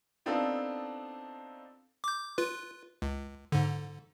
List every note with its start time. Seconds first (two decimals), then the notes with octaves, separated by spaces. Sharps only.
0.26 B3 C4 D4 D#4 F4 A4
2.04 D6 G6
2.38 F4 B4
3.02 C#2
3.52 G#2 D3